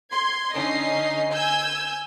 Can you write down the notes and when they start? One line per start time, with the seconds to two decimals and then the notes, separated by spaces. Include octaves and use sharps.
0.10 C6 G#6
0.54 D3 C#4 D#4 D#5 C7
1.33 G#5 E6 G6 G#6